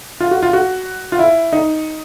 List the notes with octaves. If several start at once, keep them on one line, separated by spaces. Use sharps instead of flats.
F4
F#4
F4
F#4
F4
E4
D#4